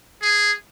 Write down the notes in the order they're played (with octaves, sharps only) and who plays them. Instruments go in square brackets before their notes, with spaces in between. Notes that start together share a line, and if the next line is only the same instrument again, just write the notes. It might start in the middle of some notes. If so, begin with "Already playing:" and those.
[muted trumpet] G#4